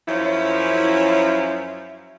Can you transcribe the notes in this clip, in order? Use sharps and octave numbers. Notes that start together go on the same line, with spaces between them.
F#2 F3 C#4 E4